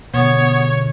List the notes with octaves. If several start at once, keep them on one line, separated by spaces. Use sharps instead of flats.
B2 D3 B3 C#5